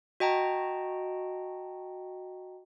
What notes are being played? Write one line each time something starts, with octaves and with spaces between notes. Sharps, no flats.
F#4 D#5 G5 A5 A#5